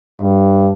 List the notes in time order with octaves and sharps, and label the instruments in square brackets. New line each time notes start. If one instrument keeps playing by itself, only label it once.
[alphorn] G2